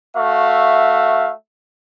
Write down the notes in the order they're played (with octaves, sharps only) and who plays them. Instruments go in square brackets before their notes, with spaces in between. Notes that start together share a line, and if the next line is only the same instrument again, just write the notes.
[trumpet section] A3 F#4 E5 F5